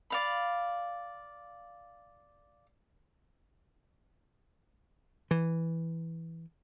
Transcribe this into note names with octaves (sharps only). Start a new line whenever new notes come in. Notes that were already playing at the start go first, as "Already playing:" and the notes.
D5 F5 B5
E3